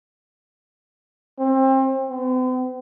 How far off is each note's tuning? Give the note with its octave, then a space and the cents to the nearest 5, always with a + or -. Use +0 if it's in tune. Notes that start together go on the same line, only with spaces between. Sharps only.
C4 +30
C4 -45